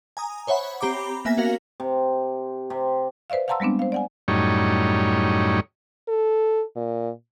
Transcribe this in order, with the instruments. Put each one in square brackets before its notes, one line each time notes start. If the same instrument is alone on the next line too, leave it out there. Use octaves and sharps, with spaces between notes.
[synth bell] G#5 A#5 D#6
C5 C#5 E5 F#5 B5
C4 G4 A#5 B5 D6
A#3 B3 E5 G#5 A#6 B6
C#4 F#4 A#4 F5
[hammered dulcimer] C3
C3
[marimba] B4 C5 D5 E5 F5
F5 F#5 A5 A#5 C6 E6
G3 G#3 B3 C4 D4
C5 F5
D5 F#5 G#5
[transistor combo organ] F#2 A2 G3 D#4 C#5
[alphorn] A4
A#2